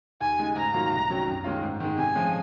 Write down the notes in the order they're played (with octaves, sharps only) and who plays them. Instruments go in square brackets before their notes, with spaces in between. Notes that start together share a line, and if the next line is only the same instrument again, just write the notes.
[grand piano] D#2 [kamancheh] G#5
[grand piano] C#3 G#3 D#4
[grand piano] G#2 [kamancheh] A#5
[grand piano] D#3 F#3 A#3 F4
C2
C3 D#3 F#3 C#4
F#2
D#3 G#3 C#4 F4
G#2
D#3 G#3
[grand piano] C3 [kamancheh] G#5
[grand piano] F3 G#3 C#4